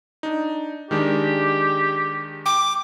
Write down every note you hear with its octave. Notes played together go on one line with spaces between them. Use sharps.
D4 D#4
D#3 G#3 D4 G4
G5 D6